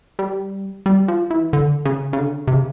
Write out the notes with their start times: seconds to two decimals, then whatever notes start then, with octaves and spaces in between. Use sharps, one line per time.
0.19 G3
0.86 G3
1.08 F3
1.30 E3
1.53 D3
1.85 C#3
2.13 C#3
2.19 D3
2.48 C3
2.53 C#3